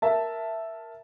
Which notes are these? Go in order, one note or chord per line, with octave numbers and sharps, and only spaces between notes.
A#4 E5 A5